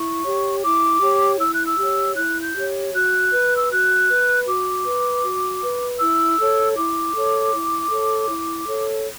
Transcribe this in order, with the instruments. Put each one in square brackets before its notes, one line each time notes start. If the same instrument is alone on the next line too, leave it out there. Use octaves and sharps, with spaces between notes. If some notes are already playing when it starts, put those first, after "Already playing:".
Already playing: [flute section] E4 C#6
G4 C#5
E4 D6
G4 C#5
E4 E6
F#6
E6
G4 C#5
E4 F#6
G6
G4 C#5
F#4 F#6
B4
E6
F#4 F#6
B4
F#4 D6
B4
F#4
B4
E4 E6
A4 C#5
E4 D6
A4 C#5
E4
A4 C#5
E4
A4 C#5